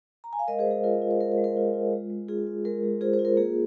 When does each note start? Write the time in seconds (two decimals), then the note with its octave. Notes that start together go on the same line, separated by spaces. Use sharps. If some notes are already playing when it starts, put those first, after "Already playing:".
0.24 A#5
0.33 G#5
0.39 F5
0.48 G#3 A#4 D#5
0.59 G#4 C5
0.66 G#3
0.71 G#4
0.84 F4 A#4
1.02 F4
1.11 C5
1.20 G#3 A#4
1.32 A#4
1.38 G#3
1.44 A#4
1.57 F4
1.74 F4
1.93 G#3
2.10 G#3
2.29 F4 G#4
2.47 F4
2.65 G#3 A#4
2.83 G#3
3.01 F4 G#4 C5
3.13 G#4 C5
3.19 F4
3.25 A#4
3.37 A#3 G#4